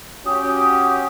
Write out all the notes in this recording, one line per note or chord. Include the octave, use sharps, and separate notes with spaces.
C#4 F#4 G4 D#6